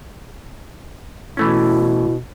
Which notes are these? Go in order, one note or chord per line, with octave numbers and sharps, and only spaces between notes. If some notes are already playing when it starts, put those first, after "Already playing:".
B2 E3 A3 C#4 E4